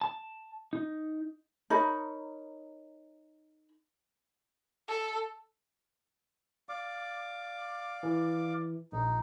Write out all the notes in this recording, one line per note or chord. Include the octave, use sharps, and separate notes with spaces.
A5
D#4
D#4 A#4 C#5 B5
A4
D5 F5 D6
E3
A#1 D#4